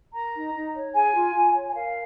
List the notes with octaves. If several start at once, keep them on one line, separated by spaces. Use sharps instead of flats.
A#4 A#5
D#4
D#4
C#5
G#4 G#5
F4
F4
C#5
G#5
A#4 F5